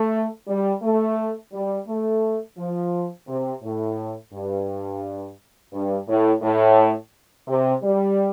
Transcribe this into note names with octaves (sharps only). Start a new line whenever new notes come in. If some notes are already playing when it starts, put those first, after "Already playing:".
Already playing: A3
G3
A3
G3
A3
F3
C3
A2
G2
G2
A2
A2
C3
G3